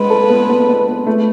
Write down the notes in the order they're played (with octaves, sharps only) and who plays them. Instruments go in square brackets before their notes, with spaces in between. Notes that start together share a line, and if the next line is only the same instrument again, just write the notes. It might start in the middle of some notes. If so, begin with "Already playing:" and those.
Already playing: [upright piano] G#3 [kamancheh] B4
[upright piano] A4
B3
B3
B3
B3
A3